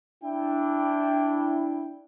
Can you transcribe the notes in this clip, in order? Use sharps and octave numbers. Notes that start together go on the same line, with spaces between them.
D4 E4 G5